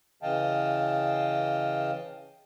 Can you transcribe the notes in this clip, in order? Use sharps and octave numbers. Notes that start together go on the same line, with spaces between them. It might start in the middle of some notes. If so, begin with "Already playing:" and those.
C#3 E3 D#5 F5 G5 A5